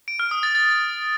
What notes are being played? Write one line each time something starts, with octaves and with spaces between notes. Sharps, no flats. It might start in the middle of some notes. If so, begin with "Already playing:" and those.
D7
F6
D#6
A6
A6